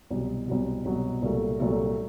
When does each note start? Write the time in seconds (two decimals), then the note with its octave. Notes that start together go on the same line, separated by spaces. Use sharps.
0.11 C2 B2 F#3
0.48 C2 B2 F#3
0.85 C2 B2 F#3
1.22 C2 A#2 F#3 A3
1.60 C2 A#2 F#3 A3